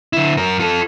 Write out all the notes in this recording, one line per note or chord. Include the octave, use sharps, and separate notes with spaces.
D3 E4
F#2 A#4
F4 A4